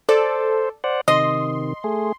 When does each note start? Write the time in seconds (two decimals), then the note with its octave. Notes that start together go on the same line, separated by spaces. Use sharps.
0.09 A4 C5 D5
0.84 C5 D5 F#5
1.08 C3 D#3 D#5 C6
1.84 A3 G#4